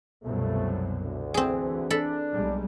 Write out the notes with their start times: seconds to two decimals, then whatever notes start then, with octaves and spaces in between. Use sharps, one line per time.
0.24 C2 F#2 B2 F3 A3
1.00 D2
1.34 E3 C4 G#4
1.90 D4 A4 B5
2.33 B1 G3 G#3